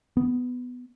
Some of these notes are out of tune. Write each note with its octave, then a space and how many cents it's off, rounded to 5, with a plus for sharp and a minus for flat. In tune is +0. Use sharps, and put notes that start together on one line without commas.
B3 +10